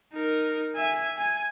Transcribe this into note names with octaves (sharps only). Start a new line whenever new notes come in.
D#4 A#4
E5 G#5
G#5